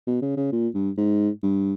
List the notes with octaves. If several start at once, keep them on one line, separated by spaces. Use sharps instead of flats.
B2
C#3
C#3
A#2
G2
G#2
G2